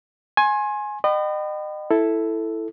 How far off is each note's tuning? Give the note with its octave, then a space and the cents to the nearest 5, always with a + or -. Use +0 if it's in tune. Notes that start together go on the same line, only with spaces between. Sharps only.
G#5 +10 C6 +35
D#5 -35 G5 -35 B5 +25
E4 +0 A4 +0